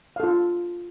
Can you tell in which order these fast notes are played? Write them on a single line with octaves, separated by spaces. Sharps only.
F5 A4 F4